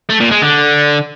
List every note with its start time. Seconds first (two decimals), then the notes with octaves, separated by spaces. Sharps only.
0.10 A3
0.21 A#2
0.31 G#3
0.42 D3